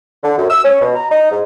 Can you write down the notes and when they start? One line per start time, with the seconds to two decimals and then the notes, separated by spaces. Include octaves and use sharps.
0.23 D3
0.37 F#2
0.50 E6
0.64 C#4
0.81 B2
0.95 A#5
1.10 D#4
1.32 G#2